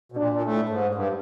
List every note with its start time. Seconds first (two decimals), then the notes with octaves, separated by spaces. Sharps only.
0.12 B2
0.17 A#2 D4
0.32 A#2
0.43 A2
0.69 G#2
0.95 G2